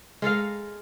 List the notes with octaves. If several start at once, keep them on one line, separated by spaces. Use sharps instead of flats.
G#3 A4 A#4 F5